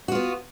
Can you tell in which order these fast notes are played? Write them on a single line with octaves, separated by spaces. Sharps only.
F#4 F4 B3